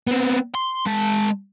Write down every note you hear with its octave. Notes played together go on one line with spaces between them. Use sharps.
B3 C4
C6
G#3 A5